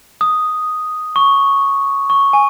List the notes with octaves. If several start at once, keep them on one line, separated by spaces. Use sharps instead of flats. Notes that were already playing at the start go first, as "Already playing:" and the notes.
D#6
C#6
C#6
G#5